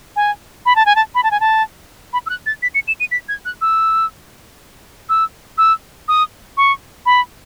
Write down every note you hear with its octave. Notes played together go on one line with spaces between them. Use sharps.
G#5
B5
A5
G#5
A5
B5
A5
G#5
A5
B5
E6
F#6
A6
B6
C#7
E7
D#7
B6
G#6
F#6
E6
E6
E6
D#6
C#6
B5